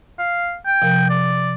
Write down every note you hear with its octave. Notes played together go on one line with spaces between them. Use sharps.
F5
G5
C3 F3 A#4
D5